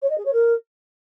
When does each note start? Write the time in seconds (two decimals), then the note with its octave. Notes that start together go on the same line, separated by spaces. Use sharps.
0.02 C#5
0.10 D#5
0.17 G#4
0.25 C#5
0.33 A#4